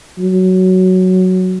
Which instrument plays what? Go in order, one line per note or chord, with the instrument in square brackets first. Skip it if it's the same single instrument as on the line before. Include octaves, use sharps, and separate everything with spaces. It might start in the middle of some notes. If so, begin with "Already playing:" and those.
[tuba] F#3